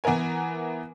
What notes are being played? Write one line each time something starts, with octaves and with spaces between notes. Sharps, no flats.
E3 B3 E4 A#4 G#5